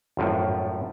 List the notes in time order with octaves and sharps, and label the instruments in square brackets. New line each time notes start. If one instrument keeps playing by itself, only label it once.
[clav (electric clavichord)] G#1 F#2 A2 F3